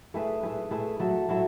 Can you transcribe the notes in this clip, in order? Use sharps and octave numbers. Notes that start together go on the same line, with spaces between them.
A3 E4 G#4 B4
A3 E4 G#4 B4
A3 E4 G#4 B4
F#3 A3 E4 A4
F#3 A3 E4 A4